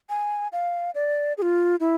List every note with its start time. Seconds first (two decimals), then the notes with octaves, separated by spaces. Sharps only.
0.09 G#5
0.52 F5
0.95 D5
1.38 G#4
1.42 F4
1.80 E4